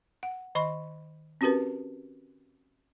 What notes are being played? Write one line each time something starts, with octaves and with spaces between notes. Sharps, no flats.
F#5
D#3 D#5 B5 C#6
C4 C#4 F#4 G4 A#4 B4